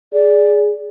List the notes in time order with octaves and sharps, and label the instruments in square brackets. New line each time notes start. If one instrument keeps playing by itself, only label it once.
[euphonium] G#4 [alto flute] D5